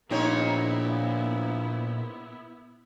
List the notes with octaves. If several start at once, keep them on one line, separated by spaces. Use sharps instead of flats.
A#1 A#2 B3 C4 D#4 E4 C#5